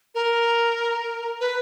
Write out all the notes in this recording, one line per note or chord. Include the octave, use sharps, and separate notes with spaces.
A#4
B4